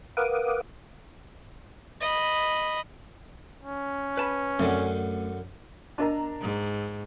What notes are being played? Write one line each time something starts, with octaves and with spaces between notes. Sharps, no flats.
A#4 B4 F5 F#5 D6 D#6
D#5 B5
C#4
B4 A5 B5
F#2 D3 A3 C4
D4 A#4 D#5 A5 A#5
G#2